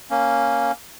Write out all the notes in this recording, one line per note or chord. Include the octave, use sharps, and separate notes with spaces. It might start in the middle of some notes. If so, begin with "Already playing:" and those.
A#3 C#4